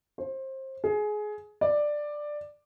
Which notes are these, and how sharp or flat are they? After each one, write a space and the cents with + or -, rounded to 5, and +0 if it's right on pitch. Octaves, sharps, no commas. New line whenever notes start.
C5 +25
G#4 +20
D5 +10